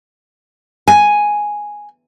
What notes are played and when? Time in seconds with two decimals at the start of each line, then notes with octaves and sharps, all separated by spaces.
0.88 G#5